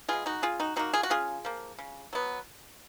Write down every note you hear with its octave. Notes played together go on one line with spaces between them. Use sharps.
G#3 B3 F4 G#4
D#4 F#4
C#3 F4 G#4
D#4 F#4
F#3 A#3 D#4 F#4
F4 G#4
F#4
C#3 F4 G#4
F3 A#3
C#3
F#3 B3